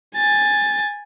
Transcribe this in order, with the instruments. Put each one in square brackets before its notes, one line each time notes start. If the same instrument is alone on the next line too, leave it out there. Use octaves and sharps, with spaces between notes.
[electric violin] G#5 A6